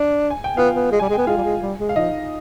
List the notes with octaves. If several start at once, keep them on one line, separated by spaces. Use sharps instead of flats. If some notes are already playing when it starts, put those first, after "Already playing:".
Already playing: D4
G#5
G5
B3 F4 F5
B3
G#3
G3 G#5
G#3
B3 G5
G#3 F4 F5
G3
G#3
G3
G#3
F5
F3 D#4 D#5